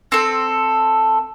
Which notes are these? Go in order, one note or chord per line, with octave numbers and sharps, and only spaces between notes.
C4 A4